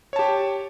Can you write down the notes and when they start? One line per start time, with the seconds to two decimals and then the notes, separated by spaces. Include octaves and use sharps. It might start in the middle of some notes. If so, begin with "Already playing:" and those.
0.13 C#5
0.16 A5
0.19 G4